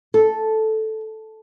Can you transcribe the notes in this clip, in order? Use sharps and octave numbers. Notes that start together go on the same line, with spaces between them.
A4